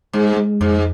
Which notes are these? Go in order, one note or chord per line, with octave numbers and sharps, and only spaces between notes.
G#2 G#3
G#3
F2 G#2